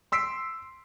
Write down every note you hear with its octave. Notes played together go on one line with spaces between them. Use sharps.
C6 E6 B6 C7 D7